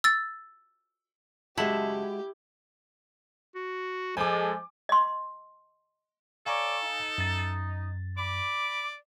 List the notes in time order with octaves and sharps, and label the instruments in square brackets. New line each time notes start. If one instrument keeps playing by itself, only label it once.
[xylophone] E6 A6
[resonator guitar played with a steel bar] F#2 C#3 A5 [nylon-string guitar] G#3 F#4 [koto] E4 [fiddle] G4
[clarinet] F#4
[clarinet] F3 [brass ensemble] G#3 A4 [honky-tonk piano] G#5 D6
[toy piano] D#5 C6
[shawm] A4 [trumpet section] C#5 D5 C#6 [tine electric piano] F5 G#5 A#5
[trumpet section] D#4
[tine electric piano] F#2 A6
[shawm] D5 [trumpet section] B5 D6